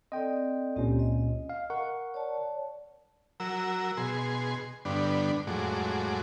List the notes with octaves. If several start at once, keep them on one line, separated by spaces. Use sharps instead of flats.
C4 A4 D5 D#5 G5
C#2 A#2 C4 C#4 G4
D#5
F5
A#4 F#5 C#6
C#5 D5 A5
F#3 A#4 E6
B2 G#4 C6
G2 D3 B3 D4
F2 A2 F#3 G#3 D6